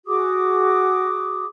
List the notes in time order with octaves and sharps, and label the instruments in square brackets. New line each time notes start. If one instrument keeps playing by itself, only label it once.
[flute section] F#4 G#4 D6 D#6